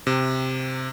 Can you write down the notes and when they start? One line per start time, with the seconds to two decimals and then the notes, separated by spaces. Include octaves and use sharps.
0.07 C3